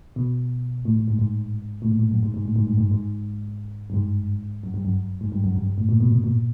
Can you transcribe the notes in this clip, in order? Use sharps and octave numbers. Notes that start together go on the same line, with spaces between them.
B2
A2
A2
G#2
G#2
A2
A#2
A2
F#2
G#2
G#2
A2
G#2
G2
G#2
G#2
G2
G#2
F#2
G2
F#2
G#2
G2
F#2
G2
G2
A2
A#2
B2
B2
A#2